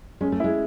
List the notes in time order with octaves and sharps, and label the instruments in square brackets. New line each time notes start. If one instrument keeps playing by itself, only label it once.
[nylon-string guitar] G#3 [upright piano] C#4
[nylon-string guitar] A3
[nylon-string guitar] G#3 [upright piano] E4